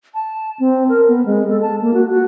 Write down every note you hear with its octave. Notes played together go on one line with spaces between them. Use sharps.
A5
C4
A#4
B3
G#3
A4
A5
A#3
F#4
F#4